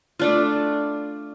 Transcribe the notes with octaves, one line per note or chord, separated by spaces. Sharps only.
A3 D4 F4